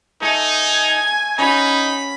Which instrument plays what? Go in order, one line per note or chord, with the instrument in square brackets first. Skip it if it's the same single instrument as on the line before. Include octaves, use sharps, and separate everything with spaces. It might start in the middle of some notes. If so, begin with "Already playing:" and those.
[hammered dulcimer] A3 [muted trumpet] D#4 [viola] G#5
[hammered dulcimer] C#4 F#4 [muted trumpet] D#4 [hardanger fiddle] B5